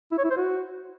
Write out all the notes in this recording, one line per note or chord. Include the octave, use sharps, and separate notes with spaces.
E4
C#5
E4
C5
F#4